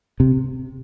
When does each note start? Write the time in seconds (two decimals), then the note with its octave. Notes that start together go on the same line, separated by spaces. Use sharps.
0.20 C3